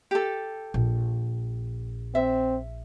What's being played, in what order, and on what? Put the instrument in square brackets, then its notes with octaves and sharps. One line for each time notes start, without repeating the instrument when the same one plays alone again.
[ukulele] G4 A4
[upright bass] A#1
[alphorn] C4 [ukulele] E5